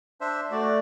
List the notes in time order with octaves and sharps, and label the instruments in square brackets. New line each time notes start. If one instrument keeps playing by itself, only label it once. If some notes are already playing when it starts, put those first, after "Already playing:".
[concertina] D4 C5 E5
[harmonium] A3 D5 [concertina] F#4